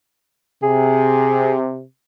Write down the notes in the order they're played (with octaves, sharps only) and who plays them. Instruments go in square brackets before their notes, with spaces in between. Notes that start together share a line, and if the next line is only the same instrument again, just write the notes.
[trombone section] C3 [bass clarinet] G#4